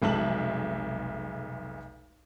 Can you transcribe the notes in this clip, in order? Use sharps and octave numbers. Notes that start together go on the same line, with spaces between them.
F1 B1 G#3 E5 A5 F#7